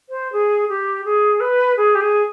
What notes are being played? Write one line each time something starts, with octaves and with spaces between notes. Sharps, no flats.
C5
G#4
G4
G#4
B4
G#4
G4
G#4